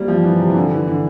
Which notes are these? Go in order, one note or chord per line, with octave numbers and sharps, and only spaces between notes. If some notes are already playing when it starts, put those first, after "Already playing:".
Already playing: G3 A#3 C4
F3
E3
C3
E3
D3
E3
D3